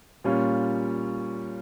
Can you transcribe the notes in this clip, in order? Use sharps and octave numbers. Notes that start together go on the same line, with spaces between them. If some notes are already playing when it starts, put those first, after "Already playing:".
A#2 G3 C#4 F4